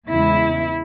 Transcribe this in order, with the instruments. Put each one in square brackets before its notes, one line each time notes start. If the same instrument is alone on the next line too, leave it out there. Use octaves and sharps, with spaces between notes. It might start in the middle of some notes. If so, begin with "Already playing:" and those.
[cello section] E2 C#3 G#3 B3 E4